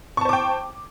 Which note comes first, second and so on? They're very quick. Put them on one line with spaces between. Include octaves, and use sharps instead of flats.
C#6 A5 C5 D6 G5